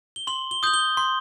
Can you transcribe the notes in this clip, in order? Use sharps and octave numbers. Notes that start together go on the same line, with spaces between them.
G7
C6 F#7
G7
D#6 G6 F#7
G7
C6